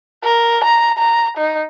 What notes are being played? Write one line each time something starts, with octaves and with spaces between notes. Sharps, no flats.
A#4
A#5
A#5
D#4